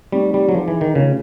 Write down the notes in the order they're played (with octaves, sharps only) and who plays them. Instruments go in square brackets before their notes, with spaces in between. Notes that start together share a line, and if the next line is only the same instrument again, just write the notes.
[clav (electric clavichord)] G3 [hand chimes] A3 C4 D#4
[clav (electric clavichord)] G3
F#3
[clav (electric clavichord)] F3 [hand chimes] D#4 G#4 B4
[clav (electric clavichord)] E3
D#3
[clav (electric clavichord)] C#3 [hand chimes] A3 C4 F4 A#4